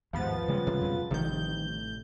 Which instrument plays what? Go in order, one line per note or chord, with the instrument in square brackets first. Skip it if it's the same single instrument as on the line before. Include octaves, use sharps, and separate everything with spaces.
[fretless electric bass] D#2 G#2 [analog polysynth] F3 B3 A6
[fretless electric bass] C#3 G3 G#3
[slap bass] C3
F2 B2
[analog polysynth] A1 G6 [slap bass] C3 F3 G3 [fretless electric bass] D#3